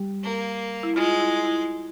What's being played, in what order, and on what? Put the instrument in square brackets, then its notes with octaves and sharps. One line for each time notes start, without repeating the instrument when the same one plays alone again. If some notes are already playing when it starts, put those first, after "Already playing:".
Already playing: [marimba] G3 G4
[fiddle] A#3
[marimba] E4
[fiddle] G#3 [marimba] F4
[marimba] E4
E4